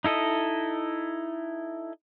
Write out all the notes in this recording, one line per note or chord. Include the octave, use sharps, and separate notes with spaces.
D#4 E4 A4 D#5